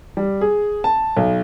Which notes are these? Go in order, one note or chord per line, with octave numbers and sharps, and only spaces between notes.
G3
G#4
A5
B1